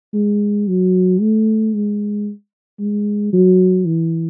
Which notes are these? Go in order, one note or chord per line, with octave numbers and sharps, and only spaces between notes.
G#3
F#3
A3
G#3
G#3
F#3
E3